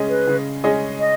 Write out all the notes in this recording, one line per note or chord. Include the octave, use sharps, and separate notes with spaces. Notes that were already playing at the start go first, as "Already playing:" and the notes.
Already playing: C#3 G#3 C#4 G#4 D#5
B4
C#3
G#3 C#4 G#4 D#5
D#5